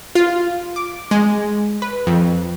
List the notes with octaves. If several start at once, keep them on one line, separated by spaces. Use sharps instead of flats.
F4
D6
G#3
B4
F2